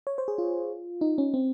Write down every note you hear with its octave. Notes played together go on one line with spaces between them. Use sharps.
C#5
C5
G#4
F4
D#4
C#4
C4